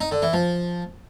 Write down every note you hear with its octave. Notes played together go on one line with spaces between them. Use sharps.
D#4
D3
E3
F3